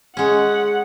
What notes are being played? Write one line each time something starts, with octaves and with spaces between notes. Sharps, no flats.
G#3 C#4 F#5